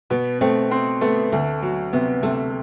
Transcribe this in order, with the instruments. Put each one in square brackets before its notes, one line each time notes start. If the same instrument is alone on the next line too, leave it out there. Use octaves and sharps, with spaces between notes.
[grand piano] B2 [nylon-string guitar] B3
[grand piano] A3 [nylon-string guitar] C4
[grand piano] C4
[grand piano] A3 [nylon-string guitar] B3
[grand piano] D2 [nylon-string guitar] A3
[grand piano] F#3
[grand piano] C3 [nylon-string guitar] B3
[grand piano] C3 [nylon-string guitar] A3